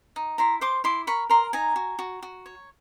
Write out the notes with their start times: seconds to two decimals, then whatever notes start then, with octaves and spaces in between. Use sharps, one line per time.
0.16 D#4
0.38 E4 A#5 C6
0.61 C5 C6 D6
0.84 E4 C6 D6
1.07 A#4 B5 C#6
1.30 A#4 A#5 C6
1.53 D#4 G#5 A#5
1.76 F#4
1.99 F#4
2.23 F#4
2.46 C#5